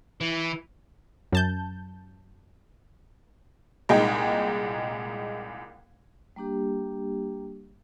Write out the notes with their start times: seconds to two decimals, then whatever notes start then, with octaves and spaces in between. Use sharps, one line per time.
0.21 E3
1.32 F#2 A5 G6
3.89 C2 A#2 G#3 D#4 G#4 G5
6.36 G3 A#3 D4 G4